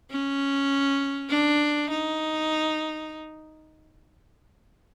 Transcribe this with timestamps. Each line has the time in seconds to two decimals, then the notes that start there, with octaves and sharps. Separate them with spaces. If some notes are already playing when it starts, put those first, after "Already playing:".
0.11 C#4
1.30 D4
1.90 D#4